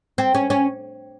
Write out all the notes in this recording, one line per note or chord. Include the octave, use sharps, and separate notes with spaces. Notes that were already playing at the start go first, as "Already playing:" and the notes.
C4
C#4
C#4